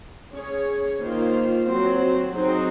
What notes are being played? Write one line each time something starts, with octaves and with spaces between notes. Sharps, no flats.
C#4 G#4 C#5
D#3 A#3 F4 C5
F#3 C4 F#4 C5
F#3 C4 D#4 G#4 C5